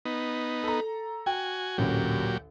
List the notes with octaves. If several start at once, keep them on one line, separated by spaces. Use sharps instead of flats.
B3 D#4
A4 A#5
F#4 G5 G#5
A1 D2 A#2 F#3 G4